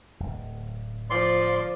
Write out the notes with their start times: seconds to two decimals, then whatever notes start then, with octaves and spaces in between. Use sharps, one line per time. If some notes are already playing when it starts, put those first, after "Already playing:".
0.20 D1 G#1
1.10 F3 D5 C6